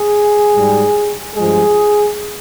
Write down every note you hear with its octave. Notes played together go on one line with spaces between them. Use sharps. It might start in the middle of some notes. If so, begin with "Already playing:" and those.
Already playing: G#4
G#2 G3
G2 F3 G#3 G#4